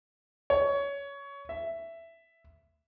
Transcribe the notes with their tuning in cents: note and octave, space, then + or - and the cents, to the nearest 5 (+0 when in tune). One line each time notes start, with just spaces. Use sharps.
C#5 +20
E5 +10